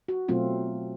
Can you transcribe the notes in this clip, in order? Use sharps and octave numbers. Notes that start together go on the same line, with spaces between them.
F#4
B2 F#3 A3 C4 F4